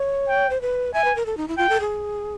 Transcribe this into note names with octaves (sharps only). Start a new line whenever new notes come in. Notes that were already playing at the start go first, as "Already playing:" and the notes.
Already playing: C#5
G5
C5
B4
E5 G#5
B4
A#4
A4
D#4
E4
F4 G5
A4
G#4